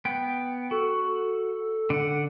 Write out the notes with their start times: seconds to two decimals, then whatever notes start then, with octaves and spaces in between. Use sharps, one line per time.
0.05 B3 G5
0.71 F#4 A4
1.90 D3 F#5